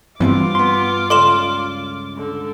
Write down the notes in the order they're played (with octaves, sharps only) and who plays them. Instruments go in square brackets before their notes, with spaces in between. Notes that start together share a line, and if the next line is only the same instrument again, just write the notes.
[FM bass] G2 [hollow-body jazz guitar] E3 B3 C4 [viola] F4 D6
[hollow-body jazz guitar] B3 C6
[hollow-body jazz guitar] C#2 D5 [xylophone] A4 C6 E7
[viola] D3